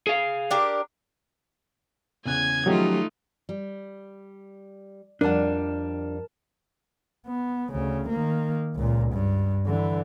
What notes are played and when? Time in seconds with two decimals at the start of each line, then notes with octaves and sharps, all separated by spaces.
0.07 G#4 F5
0.51 D4 G4 A#4
2.26 E2 C#3 G#5 F#6 G#6
2.66 D#3 F3 F#3 A3 C#4 D#4 F4 G4
3.49 G3
5.21 F2 G3 D4 A#4 D5 F#5 A5
7.27 B3
7.72 D2 C#3
8.09 D#3 A#3
8.75 C#2 A#2
9.13 G2
9.66 D3 E3